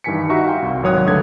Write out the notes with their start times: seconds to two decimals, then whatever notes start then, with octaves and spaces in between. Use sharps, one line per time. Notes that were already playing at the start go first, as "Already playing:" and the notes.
0.04 G2 D#3 E3 G#5 B6 C#7
0.30 D#4 F#4 G4 E5 A#5 C#6
0.46 F5 G5 C6
0.62 C2
0.83 G#1 F#3 C#5 D#6 F#6
1.06 C#2 G2 D3 A3 G#6